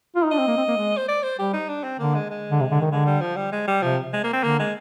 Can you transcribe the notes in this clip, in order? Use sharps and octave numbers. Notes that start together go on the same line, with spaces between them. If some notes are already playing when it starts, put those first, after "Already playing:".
F4
D#4
D4 D#5
C4
A#3
C4
A#3
G#3
C5
D5
C5
G3 G4
D#4
D4
C4
D3 A#3
G#3
G#3
D3
C3
D3
D#3
D3 G#3
G3
F3
G3
G#3
G3
C3 F3
G#3
A#3
C4
D3 A#3
G#3